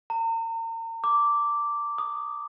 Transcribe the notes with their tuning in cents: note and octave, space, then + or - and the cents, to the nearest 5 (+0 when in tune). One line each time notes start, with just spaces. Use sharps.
A#5 -40
D6 -5
D#6 -15